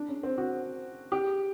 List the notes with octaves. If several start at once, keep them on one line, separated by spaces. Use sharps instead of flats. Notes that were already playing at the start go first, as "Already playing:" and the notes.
Already playing: D4
C#4
C4
F#4
G4